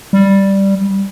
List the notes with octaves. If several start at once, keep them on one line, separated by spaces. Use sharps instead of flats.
G3